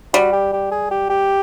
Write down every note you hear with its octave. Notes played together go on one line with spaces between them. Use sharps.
G3 F#4
G4
G4
G#4
G4
G4